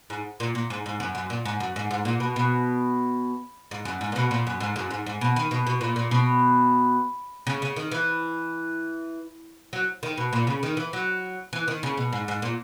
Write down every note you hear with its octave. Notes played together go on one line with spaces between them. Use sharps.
G#2
A#2
A#2
G#2
G#2
F#2
F#2
A#2
G#2
F#2
G#2
G#2
A#2
B2
B2
G#2
F#2
G#2
A#2
B2
A#2
F#2
G#2
F#2
G#2
G#2
B2
D#3
B2
B2
A#2
A#2
B2
C#3
C#3
D#3
E3
F#3
D#3
B2
A#2
C#3
D#3
E3
F#3
E3
D#3
C#3
B2
G#2
G#2
A#2